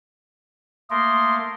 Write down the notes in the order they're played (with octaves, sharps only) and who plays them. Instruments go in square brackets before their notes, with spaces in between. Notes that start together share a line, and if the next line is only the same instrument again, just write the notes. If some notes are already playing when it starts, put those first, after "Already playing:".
[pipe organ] A3 A#3 A#4 [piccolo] C6 [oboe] D#6